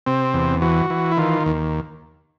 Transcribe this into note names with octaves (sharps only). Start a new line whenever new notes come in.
C3 C4
E2
E3 F#4
E3
E4
D#3 F4
D#2